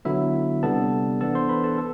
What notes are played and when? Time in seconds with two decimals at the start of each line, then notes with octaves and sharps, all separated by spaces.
0.05 D3 F#3 B3 E4 E5
0.63 C3 G3 B3 D4 A4 A5
1.21 E3 B3 D4 A4 A5
1.35 C5 C6
1.49 B4 B5
1.64 A4 A5
1.78 A4